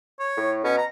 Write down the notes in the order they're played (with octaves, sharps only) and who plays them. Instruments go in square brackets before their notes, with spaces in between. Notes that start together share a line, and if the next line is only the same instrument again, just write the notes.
[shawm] C#5
[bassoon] A2
[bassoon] B2 [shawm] C#4
[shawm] A#5